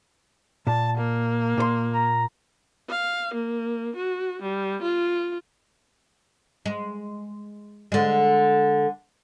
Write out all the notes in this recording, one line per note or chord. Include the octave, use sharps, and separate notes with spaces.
A#2 A5
A#3
A#2 C5 C6
A#5
F5
A#3
F#4
G3
F4
G#3
D3 G#3